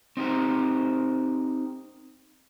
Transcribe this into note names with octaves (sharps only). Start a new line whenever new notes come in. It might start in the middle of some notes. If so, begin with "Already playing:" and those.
C4 D#4 G4 A#4 C5